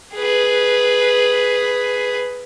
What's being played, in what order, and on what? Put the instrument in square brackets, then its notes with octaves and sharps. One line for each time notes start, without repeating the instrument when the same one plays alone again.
[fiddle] G#4 B4